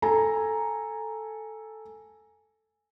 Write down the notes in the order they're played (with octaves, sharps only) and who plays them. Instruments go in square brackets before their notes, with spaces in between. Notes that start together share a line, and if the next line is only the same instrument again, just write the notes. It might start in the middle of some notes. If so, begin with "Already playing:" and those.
[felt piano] A4 G#5 A#5